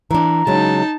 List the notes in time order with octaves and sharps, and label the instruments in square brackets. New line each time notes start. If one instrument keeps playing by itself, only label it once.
[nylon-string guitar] E3 D4 [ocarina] A#5
[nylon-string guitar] C#3 F#3 G#3 [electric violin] D#4 A5